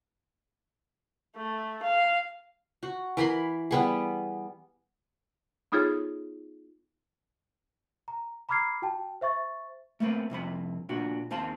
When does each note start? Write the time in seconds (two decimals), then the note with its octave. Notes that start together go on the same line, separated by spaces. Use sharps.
1.37 A3
1.82 F5
2.83 F#4
3.17 E3 A#4 B5 C6
3.71 G3 B3 G#4
5.72 B3 D#4 F4 G#4 A4 C#5
8.08 A#5
8.49 A#5 B5 D6 F6 G#6 C7
8.82 F#4 G5 A5
9.21 C5 E5 C#6 A6
10.00 A3 A#3 C4 B4
10.30 C2 F2 C4 B5
10.89 A#2 D4 F#4
11.31 D#2 C4 F5 A5 C6